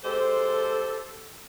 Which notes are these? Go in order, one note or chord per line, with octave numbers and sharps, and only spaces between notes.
G#3 G4 A4 C5